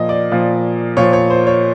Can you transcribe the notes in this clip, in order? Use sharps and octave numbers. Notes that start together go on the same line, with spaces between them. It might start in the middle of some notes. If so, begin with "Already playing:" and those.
Already playing: A#2 F3 D#5
D5
A#2 F3
A#2 F3 C#5
C#5
C5
C#5